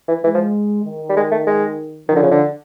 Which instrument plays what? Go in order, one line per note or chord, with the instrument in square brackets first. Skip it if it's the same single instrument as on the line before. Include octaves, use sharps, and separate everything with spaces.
[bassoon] E3
[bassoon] E3 [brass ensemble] G#3
[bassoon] F3
[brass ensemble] D#3
[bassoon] G3
G#3
A3
G#3
[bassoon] D#3 [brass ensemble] F3
[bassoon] D3
C#3
D3